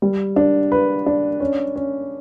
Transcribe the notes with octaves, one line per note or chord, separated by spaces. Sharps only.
G3
D4
B4
D4
C#4
C#4